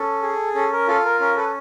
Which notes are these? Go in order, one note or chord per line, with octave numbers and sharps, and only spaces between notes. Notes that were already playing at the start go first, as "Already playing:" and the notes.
Already playing: C#4 A4
G#4
C#4 A4
A#4
F4 A4
A#4
C#4 A#4
A4 B4